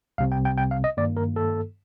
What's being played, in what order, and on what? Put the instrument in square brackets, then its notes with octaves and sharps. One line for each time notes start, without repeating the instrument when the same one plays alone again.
[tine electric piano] C2 C3 G3 C4 F5
G5
G5
G5
F5
D#5
G2 D#3 A#3 D5
A#4
A4